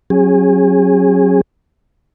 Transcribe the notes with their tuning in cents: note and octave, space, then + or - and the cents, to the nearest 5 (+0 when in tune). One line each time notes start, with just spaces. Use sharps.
F#3 +0 C#4 -35 G#4 -20